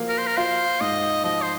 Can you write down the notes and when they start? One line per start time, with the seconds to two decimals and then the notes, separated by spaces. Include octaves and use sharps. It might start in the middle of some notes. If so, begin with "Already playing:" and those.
Already playing: F3 A#3
0.09 A#4
0.18 C5
0.27 A#4
0.37 F4 C5
0.80 G#2 D#5
1.24 F3 D#5
1.42 C5